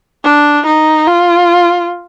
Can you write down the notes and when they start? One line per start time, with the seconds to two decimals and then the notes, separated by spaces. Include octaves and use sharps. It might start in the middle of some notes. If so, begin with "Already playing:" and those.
0.24 D4
0.66 D#4
1.07 F4